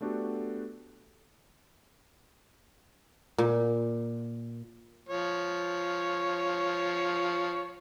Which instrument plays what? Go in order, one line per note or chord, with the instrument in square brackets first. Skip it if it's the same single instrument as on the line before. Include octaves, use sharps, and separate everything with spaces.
[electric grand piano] A3 B3 D4 F#4 G4 A4
[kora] A#2
[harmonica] F3 C#5